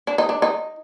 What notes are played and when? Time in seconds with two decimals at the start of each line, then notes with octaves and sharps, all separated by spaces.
0.07 D4
0.18 D#4
0.29 D4
0.42 D#4